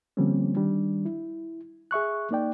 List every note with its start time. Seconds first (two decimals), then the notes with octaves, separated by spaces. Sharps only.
0.17 D3 F3 G3 A#3 C4 C#4
0.56 D#3 G3 D4
1.05 E4
1.91 G#4 E5 C#6 F#6
2.31 A#3 D#4 D5 G5